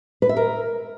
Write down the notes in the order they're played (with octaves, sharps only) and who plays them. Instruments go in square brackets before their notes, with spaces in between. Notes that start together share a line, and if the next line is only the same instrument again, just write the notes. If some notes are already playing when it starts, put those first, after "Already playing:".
[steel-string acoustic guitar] B4
E5
A#4